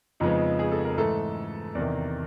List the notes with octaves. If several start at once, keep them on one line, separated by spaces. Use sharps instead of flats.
F2 C#3 F3 G#3 B3 D#4
G#4
A4
A#4
G#2 E3 A3 A4
E2 C3 D#3 D5